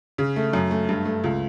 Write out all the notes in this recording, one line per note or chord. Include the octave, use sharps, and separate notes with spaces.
C#3
A3
F#2
A3
G2
A3
C#2